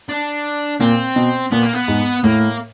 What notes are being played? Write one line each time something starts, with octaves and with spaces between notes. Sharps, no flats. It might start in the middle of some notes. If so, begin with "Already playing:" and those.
D4
A#2 C4
B2
A#2 B3
A#3
B3
G#2
A2 A#3